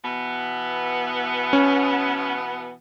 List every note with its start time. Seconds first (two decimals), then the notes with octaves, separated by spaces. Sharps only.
0.03 B2 E3 B3
1.53 C#4